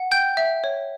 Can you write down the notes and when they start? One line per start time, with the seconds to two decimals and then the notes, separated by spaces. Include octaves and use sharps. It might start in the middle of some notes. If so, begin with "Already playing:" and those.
Already playing: F#5
0.11 G5 G6
0.37 E5
0.64 C#5